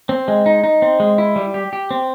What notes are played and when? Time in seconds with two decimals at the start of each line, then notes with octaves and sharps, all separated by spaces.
0.09 C4
0.28 G#3
0.46 D#4
0.64 D#4
0.82 C4
1.00 G#3
1.18 E4
1.36 G3
1.54 G4
1.73 G4
1.91 C4